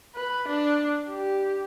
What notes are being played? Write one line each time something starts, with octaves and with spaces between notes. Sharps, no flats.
B4
D4
G4